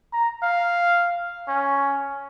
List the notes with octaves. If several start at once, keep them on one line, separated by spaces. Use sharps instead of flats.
A#5
F5
C#4